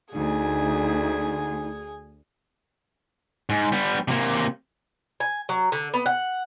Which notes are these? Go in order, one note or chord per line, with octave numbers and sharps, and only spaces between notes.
D2 D#4 G#4 G#5
G#2
G3 B3
C3 A#3
G#5
F#3
D3
B3
F#5